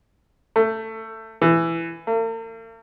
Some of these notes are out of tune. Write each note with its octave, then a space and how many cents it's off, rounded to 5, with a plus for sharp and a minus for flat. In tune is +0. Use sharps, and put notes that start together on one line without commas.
A3 +20
E3 +15
A#3 -45